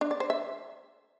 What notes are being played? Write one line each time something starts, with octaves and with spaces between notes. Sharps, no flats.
D4
D5
C5
E5